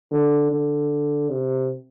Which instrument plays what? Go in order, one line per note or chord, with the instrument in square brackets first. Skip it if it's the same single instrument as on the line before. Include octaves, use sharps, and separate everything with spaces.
[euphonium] D3
D3
C3